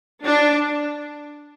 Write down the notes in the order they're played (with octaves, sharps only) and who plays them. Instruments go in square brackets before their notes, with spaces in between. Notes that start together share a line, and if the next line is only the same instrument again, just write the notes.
[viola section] D4